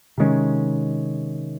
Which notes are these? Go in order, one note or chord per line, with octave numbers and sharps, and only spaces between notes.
C3 D#3 G#3 C#4